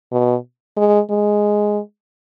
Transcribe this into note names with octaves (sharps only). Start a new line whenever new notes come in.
B2
G#3
G#3